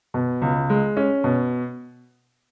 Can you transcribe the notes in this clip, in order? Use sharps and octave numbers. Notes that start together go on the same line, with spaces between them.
B2
C#2
G#3
C#4
B2